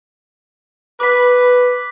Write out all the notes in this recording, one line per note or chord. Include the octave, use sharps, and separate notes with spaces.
B4 D6 B6